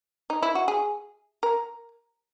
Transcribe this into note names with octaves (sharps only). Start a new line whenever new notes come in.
D#4
E4
F#4
G#4
A#4